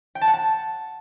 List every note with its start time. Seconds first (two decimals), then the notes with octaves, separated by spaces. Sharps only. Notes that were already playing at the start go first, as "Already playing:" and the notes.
0.15 G5
0.21 A5
0.28 F#5
0.34 A5